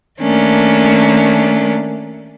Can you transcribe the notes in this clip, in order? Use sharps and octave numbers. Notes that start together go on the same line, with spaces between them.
D#3 A3 A#3 C#4 D4